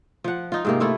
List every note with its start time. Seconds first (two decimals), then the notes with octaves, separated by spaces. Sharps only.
0.24 F3 F#5
0.52 D#4 F4
0.65 G#2 C3 A#3
0.80 A3 E4 F4